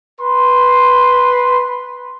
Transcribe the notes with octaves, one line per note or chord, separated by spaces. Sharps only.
B4 C6